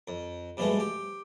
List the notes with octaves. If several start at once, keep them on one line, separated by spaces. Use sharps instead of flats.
F2
G2 B2 F3 G#3 A3
G4